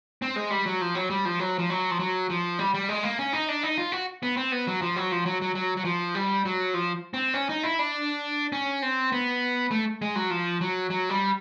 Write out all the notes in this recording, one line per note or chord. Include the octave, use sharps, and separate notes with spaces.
C4
G#3
G3
F#3
F3
F#3
G3
F3
F#3
F3
F#3
F3
F#3
F3
G3
G3
G#3
A#3
C#4
D#4
D4
D#4
F4
F#4
B3
C4
B3
F#3
F3
F#3
F3
F#3
F#3
F#3
F#3
F3
G3
F#3
F3
C4
C#4
D#4
E4
D4
C#4
C4
B3
A3
G#3
F#3
F3
F#3
F#3
G3